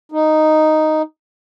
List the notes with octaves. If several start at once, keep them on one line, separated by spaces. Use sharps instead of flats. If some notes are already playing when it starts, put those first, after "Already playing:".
D#4